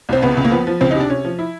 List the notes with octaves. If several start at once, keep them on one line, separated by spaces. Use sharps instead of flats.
C2 C4
C#2 B3
C#2
A#3
F3 B3
F3
C#2 C4
D#4
C3
D4
C3 C#4
F3
E4